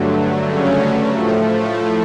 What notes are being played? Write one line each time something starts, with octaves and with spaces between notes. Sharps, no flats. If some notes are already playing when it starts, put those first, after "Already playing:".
Already playing: G2 D3 F#3 A3
C#3 C#4
A2 F3 A3